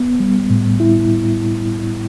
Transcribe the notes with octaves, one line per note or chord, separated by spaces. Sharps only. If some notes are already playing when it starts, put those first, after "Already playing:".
Already playing: B3
G3
A2
E4